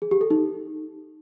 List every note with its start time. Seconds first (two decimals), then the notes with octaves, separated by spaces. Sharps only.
0.02 G#4
0.11 G4
0.21 A4
0.31 D#4